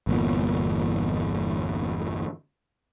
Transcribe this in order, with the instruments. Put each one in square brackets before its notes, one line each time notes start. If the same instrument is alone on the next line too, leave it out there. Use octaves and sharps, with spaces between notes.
[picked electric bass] G1 E2 A#2